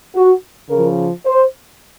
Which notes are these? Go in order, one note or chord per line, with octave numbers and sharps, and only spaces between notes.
F#4
C#3 F3 A#4
C5